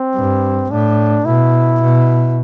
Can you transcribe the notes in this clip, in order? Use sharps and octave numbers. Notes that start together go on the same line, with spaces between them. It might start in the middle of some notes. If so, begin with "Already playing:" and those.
Already playing: C4
G2
A2 D4
B2 E4
B2